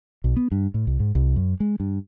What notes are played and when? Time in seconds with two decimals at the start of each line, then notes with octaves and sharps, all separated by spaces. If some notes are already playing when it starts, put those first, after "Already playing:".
0.24 B1
0.36 B3
0.52 G2
0.74 A2
0.87 C2
1.00 G#2
1.15 C2
1.36 F#2
1.60 G#3
1.80 G2